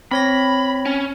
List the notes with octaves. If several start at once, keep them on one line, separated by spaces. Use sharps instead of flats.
C4 C#5 B5 A#6
C#4